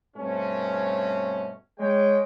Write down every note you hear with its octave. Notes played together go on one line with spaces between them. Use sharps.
G2 B2 A3 C4 C#4
G#3 C#5 G5